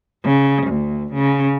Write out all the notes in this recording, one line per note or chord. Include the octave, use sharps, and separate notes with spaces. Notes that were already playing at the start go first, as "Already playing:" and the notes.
C#3
D2
C#3